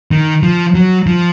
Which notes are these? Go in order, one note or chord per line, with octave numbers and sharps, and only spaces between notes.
D#3
F3
F#3
F3